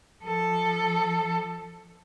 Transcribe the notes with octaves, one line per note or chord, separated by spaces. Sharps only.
F3 A4